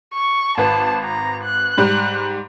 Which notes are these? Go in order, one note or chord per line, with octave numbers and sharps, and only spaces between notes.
C#6
G#1 B4 A5
A#5
F#6
G#2 G3